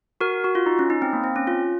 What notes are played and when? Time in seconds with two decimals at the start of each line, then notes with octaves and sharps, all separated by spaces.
0.21 F#4 A#4
0.44 F#4
0.55 F4
0.66 D#4
0.79 C#4
0.90 D#4
1.02 C4
1.13 A#3
1.24 C4
1.36 C#4
1.47 F4